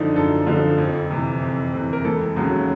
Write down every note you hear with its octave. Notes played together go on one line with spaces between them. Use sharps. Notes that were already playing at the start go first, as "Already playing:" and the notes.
Already playing: F#2 D3 F3 D4 D#4
F#2 A4
D3 F3
F2
C3 E3
F2
C3 E3
A#4
E1 A4
D#2 C#3 F#3